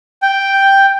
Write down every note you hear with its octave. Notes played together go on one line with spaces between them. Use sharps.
G5